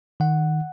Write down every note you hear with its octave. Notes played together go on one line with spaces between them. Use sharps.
D#3 F#5